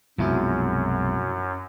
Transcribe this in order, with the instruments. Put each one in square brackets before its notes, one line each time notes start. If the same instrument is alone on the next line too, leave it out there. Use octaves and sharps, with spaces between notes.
[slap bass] B1 C3 G#3 [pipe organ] F#2 [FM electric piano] F3 E4 F#4